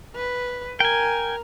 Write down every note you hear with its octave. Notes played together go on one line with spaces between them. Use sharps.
B4
A#4 G5 G#5